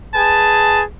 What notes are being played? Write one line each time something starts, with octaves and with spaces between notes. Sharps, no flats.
G#4 B4 G#5 A5